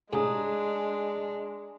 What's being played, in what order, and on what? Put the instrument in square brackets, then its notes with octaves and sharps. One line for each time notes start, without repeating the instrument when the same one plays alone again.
[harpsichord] A2 C#3 G3 [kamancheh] G#3 [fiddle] D4 [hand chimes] G#5 A#5 D#6